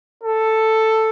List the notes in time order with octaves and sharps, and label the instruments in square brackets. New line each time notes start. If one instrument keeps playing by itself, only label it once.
[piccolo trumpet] A4